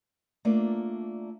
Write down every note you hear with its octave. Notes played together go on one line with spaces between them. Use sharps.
A3 A#3 D4 F4 D5